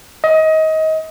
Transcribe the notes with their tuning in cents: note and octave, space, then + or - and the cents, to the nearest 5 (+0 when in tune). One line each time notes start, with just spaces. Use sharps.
D#5 +25